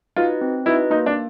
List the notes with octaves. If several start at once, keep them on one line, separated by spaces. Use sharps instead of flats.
D#4 F4 F#4 B4 D#5
C4
D#4 E4 F#4 B4 D#5
A#3 D#4
D4